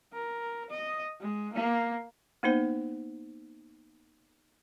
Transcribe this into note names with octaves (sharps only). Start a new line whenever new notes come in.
A#4
D#5
G#3
A#3
A#3 B3 D#4 C5